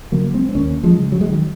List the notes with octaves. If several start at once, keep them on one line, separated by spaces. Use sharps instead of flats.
C#3 F#3 A#3
G#3 C4
C4
D#2 A#3 C#4
F3 G#3
C#3
F#3
G#3
D#3 F#3